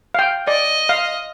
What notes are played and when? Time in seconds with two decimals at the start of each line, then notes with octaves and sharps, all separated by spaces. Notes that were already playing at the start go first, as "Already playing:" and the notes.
0.14 F5 G5
0.47 D5 D#5
0.89 F5